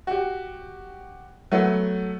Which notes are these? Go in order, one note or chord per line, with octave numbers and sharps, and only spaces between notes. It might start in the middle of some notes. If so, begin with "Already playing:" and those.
F#4 G4
F#3 A3 B3